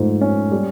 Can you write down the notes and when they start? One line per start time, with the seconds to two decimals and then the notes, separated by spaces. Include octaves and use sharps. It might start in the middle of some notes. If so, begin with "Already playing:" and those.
Already playing: G#2 F3 A3
0.21 C#4
0.52 G3